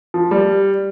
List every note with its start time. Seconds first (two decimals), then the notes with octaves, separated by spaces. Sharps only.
0.14 F3
0.31 G3